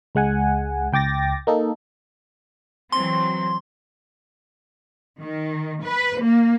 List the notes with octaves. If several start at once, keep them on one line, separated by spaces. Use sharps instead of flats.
C#2 G#3 F#5 G#5
C#2 G5 D6 A6 A#6
A#3 D#4 A4
E3 F#3 C4 C6
D#3
B4
A#3